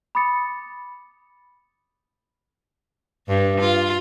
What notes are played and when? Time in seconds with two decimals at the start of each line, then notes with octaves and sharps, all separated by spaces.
0.15 B5 D6 D#6 A6 C#7
3.28 G2
3.60 F4